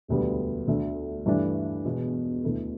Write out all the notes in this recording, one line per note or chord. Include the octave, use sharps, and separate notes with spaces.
E1 D2 D3 G3 B3
D2 D3 A3
G2 E3 A3 D4
E1 E2 B2
D2 D3 B3 E4 A4